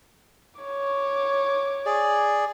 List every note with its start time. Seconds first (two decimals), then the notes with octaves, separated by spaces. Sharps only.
0.60 C#5 D6
1.86 G#4 D5